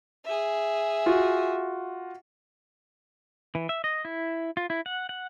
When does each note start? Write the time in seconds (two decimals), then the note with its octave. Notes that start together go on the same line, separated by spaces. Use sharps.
0.25 G#4 E5
1.06 F4 F#4
3.55 E3
3.69 E5
3.84 D#5
4.05 E4
4.57 F4
4.70 E4
4.86 F#5
5.09 F#5